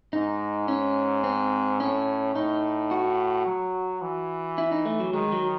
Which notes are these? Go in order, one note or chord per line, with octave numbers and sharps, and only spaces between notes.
G#2 D#4
C#4
C4
A2 C#4
A2 D#4
F#4
F#3
E3
E4
D#4
A3
F#3
D#3 G#3
F#3